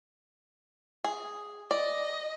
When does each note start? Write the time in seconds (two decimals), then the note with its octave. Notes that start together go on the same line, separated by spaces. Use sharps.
1.04 G#4
1.71 D5 D#5